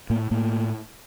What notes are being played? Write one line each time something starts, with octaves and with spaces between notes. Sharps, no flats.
A2 A#3
A2 A#3